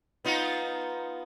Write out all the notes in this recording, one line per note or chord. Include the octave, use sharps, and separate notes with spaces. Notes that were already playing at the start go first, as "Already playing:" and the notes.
B3 D#4 F4